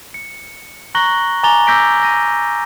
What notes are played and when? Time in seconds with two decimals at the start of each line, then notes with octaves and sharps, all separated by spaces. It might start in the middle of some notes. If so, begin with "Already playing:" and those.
0.14 C#7
0.95 A#5 C#6 F#6 A#6 F#7 G7
1.43 G#5 A#5 D6 A6 F7 G7
1.67 D6 E6 G6 A#6 B6 D7
2.02 A#6 D#7